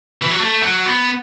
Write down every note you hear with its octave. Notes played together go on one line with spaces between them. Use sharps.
E3
F#3
A3
F#3
B3